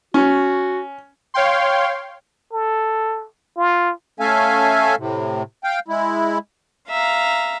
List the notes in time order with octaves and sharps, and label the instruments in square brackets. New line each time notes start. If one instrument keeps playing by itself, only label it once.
[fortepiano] C#4 [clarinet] F#4
[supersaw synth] C#5 F5 G5 C6
[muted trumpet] A4
F4
[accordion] A3 C#4 A4 E5 F5 G#5
A2 C3
F5 G5
G#3 E4
[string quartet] E5 F5 A#5